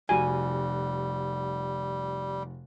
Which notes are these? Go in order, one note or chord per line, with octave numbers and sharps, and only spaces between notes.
F1 G3 F#4 G#5